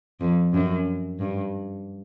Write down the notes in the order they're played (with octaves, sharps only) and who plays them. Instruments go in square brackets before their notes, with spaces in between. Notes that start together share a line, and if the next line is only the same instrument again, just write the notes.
[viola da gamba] F2
F#2
G2